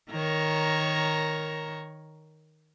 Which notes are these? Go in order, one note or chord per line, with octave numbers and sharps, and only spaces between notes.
D#3 A#4 C#5